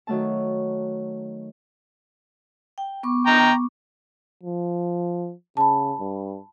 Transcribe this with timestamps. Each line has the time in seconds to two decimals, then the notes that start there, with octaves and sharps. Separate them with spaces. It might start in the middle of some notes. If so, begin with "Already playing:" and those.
0.07 D#3 F#3 A3 A5
2.78 G5
3.03 B3 C#6 D6
3.27 G5 A#5
4.43 F3
5.57 C#3 A5 B5
5.99 G2